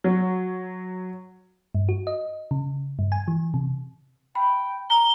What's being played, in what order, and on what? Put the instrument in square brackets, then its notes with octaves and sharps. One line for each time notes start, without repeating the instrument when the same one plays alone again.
[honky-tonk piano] F#3
[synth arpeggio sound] G2
F#4
D#5
C#3
G2
G#5
E3
C3
[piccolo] G5 [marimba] B5
[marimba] A#5 [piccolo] G7